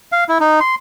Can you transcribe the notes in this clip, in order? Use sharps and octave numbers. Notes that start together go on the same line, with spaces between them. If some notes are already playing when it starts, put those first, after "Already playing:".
F5
E4
D#4
C6